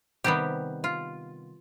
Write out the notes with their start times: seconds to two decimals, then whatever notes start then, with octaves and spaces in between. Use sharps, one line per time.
0.24 C3 D#3 G3 B3 G4
0.84 F4